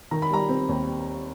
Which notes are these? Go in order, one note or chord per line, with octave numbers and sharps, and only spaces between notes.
D#3 A#5
B5
G3 A#5
C4
D#2